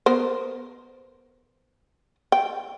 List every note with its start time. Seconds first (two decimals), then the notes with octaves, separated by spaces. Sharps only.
0.06 B3 A#4 C5
2.32 G5